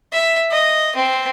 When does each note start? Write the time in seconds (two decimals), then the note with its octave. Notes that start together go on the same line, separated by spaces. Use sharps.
0.12 E5
0.51 D#5
0.96 C4